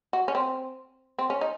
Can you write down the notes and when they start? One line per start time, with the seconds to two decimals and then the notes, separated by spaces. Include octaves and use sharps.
0.13 F#4
0.28 C#4
0.35 C4
1.18 C4
1.30 C#4
1.41 D#4